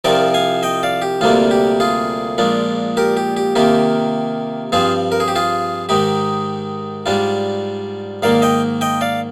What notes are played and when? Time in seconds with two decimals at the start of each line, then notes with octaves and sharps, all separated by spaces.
0.04 C2 C3 F3 C4 F4 A#4 D5
0.34 F5 G#5
0.63 D#5 G5
0.83 D5 F5
1.02 G4
1.21 D2 C3 G3 A#3 D4 F4
1.51 G4
1.80 F4 G#4
2.38 A#1 A#2 G#3 D4 F4
2.97 G4 A#4
3.17 G4
3.37 G4
3.55 C3 D#3 A#3 F4 G4
4.72 G2 F3 C4 F4 G#4
5.12 A#4
5.20 G#4
5.28 G4
5.36 F4 G#4
5.89 G#2 D#3 G#3 D#4 G4
7.06 G#2 G3 D4 F4
8.22 G#2 D#3 A#3 D5 F5
8.42 D#5 G5
8.81 D#5 G5
9.01 D5 F5